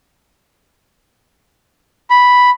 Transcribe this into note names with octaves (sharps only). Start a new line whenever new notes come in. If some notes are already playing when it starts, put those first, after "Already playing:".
B5